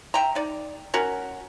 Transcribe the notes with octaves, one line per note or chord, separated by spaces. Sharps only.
E5 G5 A#5
D#4 D5
C#4 F#4 A#4